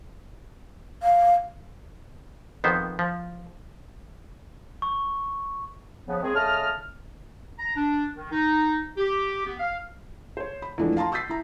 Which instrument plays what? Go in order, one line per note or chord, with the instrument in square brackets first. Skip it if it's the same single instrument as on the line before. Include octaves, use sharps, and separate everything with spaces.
[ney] F5
[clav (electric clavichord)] F2 D#3 B3 C5
F3
[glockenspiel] C#6
[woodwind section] C#3 F3 B3
D#2 D#3 G#3 C4 G#4
C#3 A3 D#5 A5 F6
A#5
D4
D#3
D#4
G4
B3
F5
[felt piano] C5 C#5
B5
E2 E3 F3 G#3 A3 D4
F5 A5 A#5 C6
C#6 E6 G6 A6 B6 C7
E4 A#5